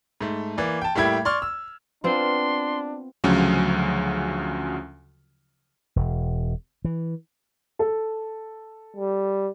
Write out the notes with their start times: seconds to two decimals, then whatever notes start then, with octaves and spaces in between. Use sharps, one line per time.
0.21 G#2 A3
0.57 E3 A#3 D5
0.81 G5 A5
0.95 A2 G3 A#3 E4 G5 G#6
1.25 D5 C6 C#6 F6
1.42 E6
2.04 B3 C4 D4 F4 C6
3.24 D2 C#3 F3 F#3 C#4 F4
5.96 E1
6.85 E3
7.79 A4
8.97 G3